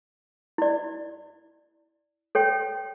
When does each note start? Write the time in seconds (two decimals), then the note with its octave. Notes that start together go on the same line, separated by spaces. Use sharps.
0.58 E4 D5
2.35 A4 C#5 G5